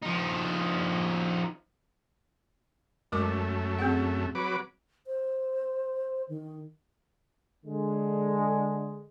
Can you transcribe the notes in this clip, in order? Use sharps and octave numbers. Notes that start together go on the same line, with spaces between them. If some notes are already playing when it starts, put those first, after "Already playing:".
F3 D#4
F#2 G#3 A3 A#4 D6
C4 G#4 F#5
F#3 B4 D6
C5
D#3
D3 G#3